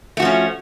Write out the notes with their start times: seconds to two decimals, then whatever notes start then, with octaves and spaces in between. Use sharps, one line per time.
0.17 A3
0.20 F#4
0.22 F3
0.25 C#4